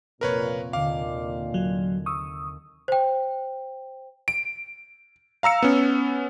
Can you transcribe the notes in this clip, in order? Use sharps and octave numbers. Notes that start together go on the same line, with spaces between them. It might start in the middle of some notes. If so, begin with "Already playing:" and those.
F1 A#2 C4 A#4 B4 C#5 C#6
D#2 D3 F5 D6
F#3 G#6
C#6 D#6 E6
C5 G5
D7
F5 A#5 E6 C#7
B3 C#4